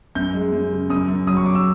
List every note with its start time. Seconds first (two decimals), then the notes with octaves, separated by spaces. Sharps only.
0.15 F#2 G6
0.33 G#3
0.52 F#2
0.71 C#3
0.90 F#2 D#6
1.08 F#2
1.27 F#3 D#6
1.37 C#6
1.46 F#3 D6
1.55 E6